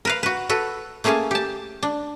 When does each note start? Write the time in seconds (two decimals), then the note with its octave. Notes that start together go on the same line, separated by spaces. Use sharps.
0.05 A#4 B4 F5
0.23 F#4 B4
0.49 F#4 A4 B4
1.04 A3 A#3 C#4 G#4 G#5 A5
1.31 G4 A5
1.83 D4